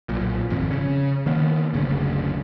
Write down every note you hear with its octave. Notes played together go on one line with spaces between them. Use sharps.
B1 A#2
G#1 F2
C#3 C#4
D#3 A#3 B3
F#1 D2 C#3